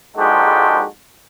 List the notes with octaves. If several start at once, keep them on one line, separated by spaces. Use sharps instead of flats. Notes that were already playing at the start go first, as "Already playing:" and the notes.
A#1 G#2 G#3 F#4 G4 A4